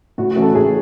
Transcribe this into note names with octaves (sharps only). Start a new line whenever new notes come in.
A2 F#4
F#4
E3 A3 C#4
A4
A2 G#4